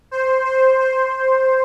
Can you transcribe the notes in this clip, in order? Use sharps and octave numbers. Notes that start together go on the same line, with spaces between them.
C5
C5
C5